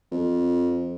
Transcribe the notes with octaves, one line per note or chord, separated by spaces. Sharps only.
F2